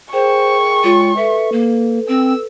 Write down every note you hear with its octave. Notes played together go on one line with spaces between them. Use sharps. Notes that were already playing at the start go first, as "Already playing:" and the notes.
G#4 A#4 C5 G5 C#6
G#3 F4 C#5 G5
A4 B4 E5
A#3
C4 E6